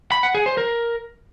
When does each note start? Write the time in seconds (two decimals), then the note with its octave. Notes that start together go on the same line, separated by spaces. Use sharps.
0.12 B5
0.23 F#5
0.35 G#4
0.46 C5
0.57 A#4